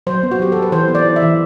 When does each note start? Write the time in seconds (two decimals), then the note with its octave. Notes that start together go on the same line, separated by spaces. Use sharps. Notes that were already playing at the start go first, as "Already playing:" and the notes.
0.07 F#3 C5
0.23 B3
0.31 F#4
0.39 F#3 G4
0.52 F#3 A4
0.62 B4
0.72 E3 C5
0.88 B3
0.95 D5
1.05 E4
1.16 E5
1.22 E3